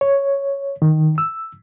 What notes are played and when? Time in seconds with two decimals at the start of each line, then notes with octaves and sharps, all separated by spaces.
0.01 C#5
0.82 D#3
1.18 E6